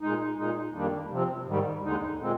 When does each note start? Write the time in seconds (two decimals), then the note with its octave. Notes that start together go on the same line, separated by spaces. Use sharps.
0.01 A#2 G#3 D#4
0.37 A#2 G#3 D#4
0.74 F2 D#3 G3 A#3 D4
1.10 C3 F3 C4
1.46 G#2 D#3 G3
1.83 D#2 D3 G#3 D#4
2.19 A#2 G#3 C4